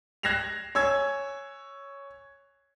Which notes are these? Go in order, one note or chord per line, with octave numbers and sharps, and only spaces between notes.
F#6 G#6 A#6 C7 E7 F7
C#5 G#5 E6 G#6